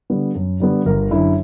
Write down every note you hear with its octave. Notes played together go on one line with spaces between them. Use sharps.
D3 G3 B3
F#2
D3 G3 B3
G1 A#4
F#2 D3 E4